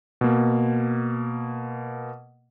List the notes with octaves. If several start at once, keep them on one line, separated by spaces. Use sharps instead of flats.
B2 A#3